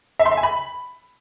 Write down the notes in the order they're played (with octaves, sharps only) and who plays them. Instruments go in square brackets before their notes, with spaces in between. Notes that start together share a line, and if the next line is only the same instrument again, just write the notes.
[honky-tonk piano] E5
C6
E5
G#5
B5